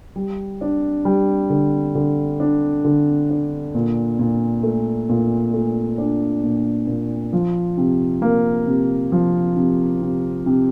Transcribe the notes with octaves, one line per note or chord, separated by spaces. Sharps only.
G3
D4
G3
D3
D3
D4
D3
D4
A#2
A#2
A3
A#2
A3
D4
A#2
A#2
F3
C3
A#3
C3
F3
C3
C3
C3